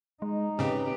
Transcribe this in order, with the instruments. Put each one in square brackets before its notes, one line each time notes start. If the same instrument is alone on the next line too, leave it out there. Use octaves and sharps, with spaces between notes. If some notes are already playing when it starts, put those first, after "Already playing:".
[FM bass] G#3 [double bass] D#4
[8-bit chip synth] G#2 C#3 [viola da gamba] C4 G4 B4 [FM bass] C#4